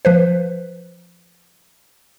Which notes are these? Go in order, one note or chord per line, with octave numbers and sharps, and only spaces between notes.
F3 B4 C5